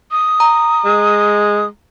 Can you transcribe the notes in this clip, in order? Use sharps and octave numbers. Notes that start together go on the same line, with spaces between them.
D#6
A#5
G#3